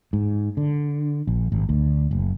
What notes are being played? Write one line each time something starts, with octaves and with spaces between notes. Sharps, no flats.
G#2
D3
A#1
G#1
D2
F#1